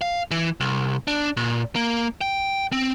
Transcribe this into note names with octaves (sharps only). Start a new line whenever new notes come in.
F5
E3
C2
D4
A#2
A#3
G5
C4